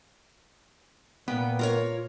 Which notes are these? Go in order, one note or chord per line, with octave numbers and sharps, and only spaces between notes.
A#2 B3 G5
F4 A#4 C#5